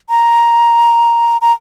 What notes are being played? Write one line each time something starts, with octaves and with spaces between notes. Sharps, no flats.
A#5
A#5